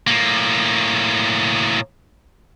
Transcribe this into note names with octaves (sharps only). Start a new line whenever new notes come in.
A2 A#3